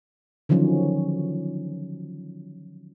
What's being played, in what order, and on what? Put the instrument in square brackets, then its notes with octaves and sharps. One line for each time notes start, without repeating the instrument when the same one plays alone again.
[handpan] D3 D#3 F3 F#3 C#4